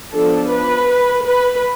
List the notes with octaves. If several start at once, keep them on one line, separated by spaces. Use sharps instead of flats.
F3 B3 D4 A4
B4
B4